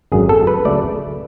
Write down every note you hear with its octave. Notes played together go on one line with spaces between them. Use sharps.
G#1 F#2 D3 F#3 G#4
A4
B4
D2 C#3 F#3 A3 D5